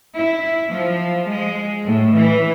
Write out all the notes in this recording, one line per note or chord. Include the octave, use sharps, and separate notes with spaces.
E4
F3
G#3
A2
E3